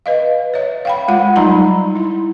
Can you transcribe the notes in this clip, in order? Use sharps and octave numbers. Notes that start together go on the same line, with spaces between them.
B4 D#5 F5
C#5 E5
F5 G5 B5
G#3 F4 F#5
F#3 G3 D#4 A#5 B5
E4